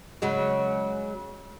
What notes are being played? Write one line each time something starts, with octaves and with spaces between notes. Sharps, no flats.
C#3 F#3 G#3